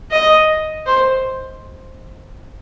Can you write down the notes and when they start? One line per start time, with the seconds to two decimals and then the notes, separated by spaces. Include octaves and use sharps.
0.11 D#5
0.86 C5